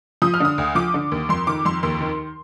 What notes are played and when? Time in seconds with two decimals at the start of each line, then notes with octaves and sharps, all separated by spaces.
0.22 F3 D#6
0.34 F6
0.40 D3 D#6
0.58 D2
0.75 F3 D6
0.94 D3
1.11 D#2
1.29 F2 C6
1.47 D#3 D6
1.65 F2 C6
1.83 D#2 C6
2.01 D#3